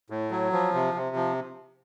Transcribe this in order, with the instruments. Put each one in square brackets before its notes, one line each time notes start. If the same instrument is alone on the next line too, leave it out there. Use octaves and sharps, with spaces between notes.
[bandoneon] A2
F#3
F3
C3
C3
F3